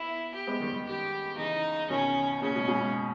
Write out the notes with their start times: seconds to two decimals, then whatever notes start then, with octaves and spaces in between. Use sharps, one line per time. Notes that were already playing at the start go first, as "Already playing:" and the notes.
Already playing: B3 E4
0.34 G4
0.47 G#3 B3
0.60 D#3 G3
0.73 D#3 G3
0.87 G4
1.38 C#3 E3 D#4
1.90 B2 D#3 C#4
2.41 A#2 C#3 C#4
2.55 G#2 B2
2.68 G#2 B2
2.81 G#2